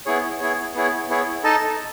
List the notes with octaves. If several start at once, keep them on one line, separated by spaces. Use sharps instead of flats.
B3 E4 G#4 C#5
B3 E4 G#4 C#5
B3 E4 G#4 C#5
B3 E4 G#4 C#5
D#4 A4 D#5 A5